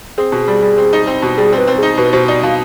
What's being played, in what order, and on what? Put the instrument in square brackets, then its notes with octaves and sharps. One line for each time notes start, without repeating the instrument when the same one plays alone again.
[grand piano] C4 [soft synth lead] G#4
[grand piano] B2
G3
G3
C4
D#4
C4
B2
[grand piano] G3 [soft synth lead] G#4
[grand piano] C4
[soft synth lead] B4
[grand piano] C4
[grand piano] D#4 [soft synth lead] G#4
[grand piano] B2 [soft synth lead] B4
[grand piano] B2 [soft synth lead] C5
[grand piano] D#4 [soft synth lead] D5
[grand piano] B2 [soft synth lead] F5